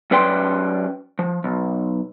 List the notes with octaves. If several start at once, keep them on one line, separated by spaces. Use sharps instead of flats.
F#2 C#4 B4 D5 G5 C6
F3
B1